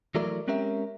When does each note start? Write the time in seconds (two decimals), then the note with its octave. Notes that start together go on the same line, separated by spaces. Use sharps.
0.15 E3 F#3 A3 E4 A#4 D5
0.48 G#3 C4 C#4 G4 A#4 E5